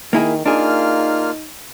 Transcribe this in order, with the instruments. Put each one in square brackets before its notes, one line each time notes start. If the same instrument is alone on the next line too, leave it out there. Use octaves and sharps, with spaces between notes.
[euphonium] D#3 [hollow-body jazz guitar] A#3 E4 G#4
[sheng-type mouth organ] A#3 F4 F6 [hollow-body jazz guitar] D4 G#4 [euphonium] D#4